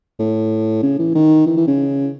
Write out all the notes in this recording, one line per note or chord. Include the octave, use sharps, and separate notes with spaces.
A2
C#3
E3
D#3
E3
E3
C#3